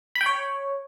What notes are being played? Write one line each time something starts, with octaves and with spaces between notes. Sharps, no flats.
B5
G5
C#5